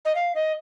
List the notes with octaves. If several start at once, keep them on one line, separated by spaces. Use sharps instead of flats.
D#5
F5
D#5